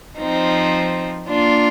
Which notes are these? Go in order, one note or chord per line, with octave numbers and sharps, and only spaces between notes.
F3 C4 D#4
A#3 D4 F4